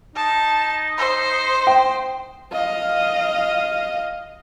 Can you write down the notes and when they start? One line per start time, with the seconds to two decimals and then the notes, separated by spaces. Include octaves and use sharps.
0.16 D#4 A5
0.98 C5
1.67 G5
2.52 D#5 F5